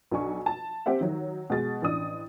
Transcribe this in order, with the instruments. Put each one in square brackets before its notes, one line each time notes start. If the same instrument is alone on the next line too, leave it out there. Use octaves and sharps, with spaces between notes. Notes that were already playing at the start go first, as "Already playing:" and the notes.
[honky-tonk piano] B1 D4 G#5 C#6
A5
C4 G4 C5 E5 F#5
D#3 F#3
B2 G#3 A6
A1 D4 D#6